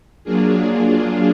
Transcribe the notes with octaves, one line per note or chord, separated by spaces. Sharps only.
F#3 A#3 D4 F4 G#4